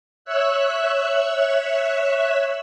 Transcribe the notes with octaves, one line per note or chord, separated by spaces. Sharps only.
C#5 E5 E6 F#6